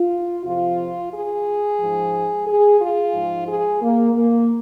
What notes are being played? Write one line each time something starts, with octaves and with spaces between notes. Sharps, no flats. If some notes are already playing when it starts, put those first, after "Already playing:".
Already playing: F4
F2 C3 F3 F4
G#4
G#2 F3
G#4
F4
G#2 F3
G#4
A#3
A#3